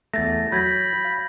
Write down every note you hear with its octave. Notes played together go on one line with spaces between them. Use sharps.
E2 A3 A6 A#6
F#3 B5 G6 G#6 A#6
F5